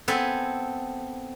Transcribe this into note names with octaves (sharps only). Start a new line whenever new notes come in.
B3 C4 A4 B4 G#5